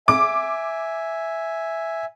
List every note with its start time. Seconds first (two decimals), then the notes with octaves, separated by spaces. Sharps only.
0.08 E5 G#5 D6